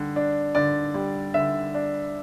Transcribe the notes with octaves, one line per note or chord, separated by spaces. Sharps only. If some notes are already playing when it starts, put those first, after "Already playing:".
Already playing: D3 G3
D4
D3 D5
G3
D3 E5
D4